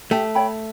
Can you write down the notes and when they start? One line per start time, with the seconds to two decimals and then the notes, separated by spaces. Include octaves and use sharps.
0.11 A3 G4
0.35 C#5 G5 B5